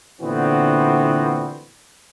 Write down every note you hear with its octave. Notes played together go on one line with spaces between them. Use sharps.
A#2 D3 E3 B3 C4 F#4